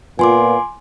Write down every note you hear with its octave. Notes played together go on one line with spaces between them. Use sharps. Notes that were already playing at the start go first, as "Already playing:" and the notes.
A#2 B3 F4 G#5 C6 D6